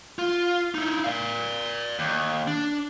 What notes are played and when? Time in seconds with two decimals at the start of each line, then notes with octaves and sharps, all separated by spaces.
0.19 F4
0.75 D#4 E4
1.04 D5 F5
1.99 D#2
2.47 D4